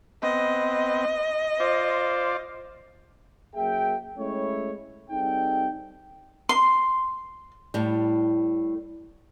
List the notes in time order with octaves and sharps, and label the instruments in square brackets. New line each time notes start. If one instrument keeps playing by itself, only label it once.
[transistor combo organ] B3 C4 [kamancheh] D#5
[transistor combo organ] F4 D5 [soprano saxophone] C5
[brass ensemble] F#2 A#3 G#4 E5 G5
G#3 A3 C#4 E4 C#5
G3 C4 D#4 G#4 A4 G5
[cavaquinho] C6
[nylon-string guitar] A2 G3